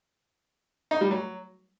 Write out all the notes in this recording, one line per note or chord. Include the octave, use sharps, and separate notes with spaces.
D#4
G3
F#3